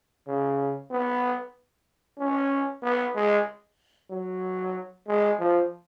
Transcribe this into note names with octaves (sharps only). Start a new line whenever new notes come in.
C#3
B3
C#4
B3
G#3
F#3
G#3
F3